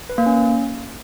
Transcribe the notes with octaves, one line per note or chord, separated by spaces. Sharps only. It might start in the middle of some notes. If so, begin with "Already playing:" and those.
B4
A#3
C#4